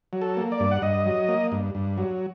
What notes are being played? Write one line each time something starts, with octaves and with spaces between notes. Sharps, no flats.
F#3
A4
A#3
D5
G2
F#5
G2 D#5
F#3
A#3
G2
G2
F#3